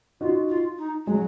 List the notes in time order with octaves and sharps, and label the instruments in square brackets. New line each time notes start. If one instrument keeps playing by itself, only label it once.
[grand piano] D#4 F#4 [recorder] F4
[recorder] F4
D#4
[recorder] F#3 [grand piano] G#3